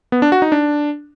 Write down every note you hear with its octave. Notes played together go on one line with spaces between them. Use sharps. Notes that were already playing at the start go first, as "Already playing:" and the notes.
B3
D4
F#4
D#4
D4